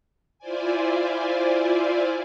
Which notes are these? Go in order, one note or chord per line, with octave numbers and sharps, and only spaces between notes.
E4 F4 C5 D5 G#5